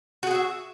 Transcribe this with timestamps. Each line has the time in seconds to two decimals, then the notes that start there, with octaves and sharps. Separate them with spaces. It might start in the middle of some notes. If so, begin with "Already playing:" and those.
0.23 F#4
0.27 G#4
0.31 F#5
0.35 E5